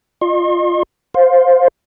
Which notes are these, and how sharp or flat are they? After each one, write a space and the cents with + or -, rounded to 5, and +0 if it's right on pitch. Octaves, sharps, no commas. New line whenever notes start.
F4 +0 D#5 -35 C6 +40
C5 +0 F5 +15